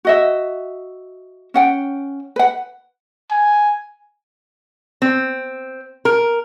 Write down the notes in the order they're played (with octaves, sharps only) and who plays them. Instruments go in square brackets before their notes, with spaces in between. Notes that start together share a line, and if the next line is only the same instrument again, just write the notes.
[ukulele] F#4 D#5 E5
C#4 F#5 G5
B4 F#5
[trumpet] G#5
[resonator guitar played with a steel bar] C4
A#4